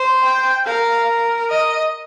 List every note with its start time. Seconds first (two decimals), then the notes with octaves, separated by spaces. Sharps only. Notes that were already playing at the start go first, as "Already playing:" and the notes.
Already playing: C5
0.24 G5
0.66 A#4 F5
1.50 D#5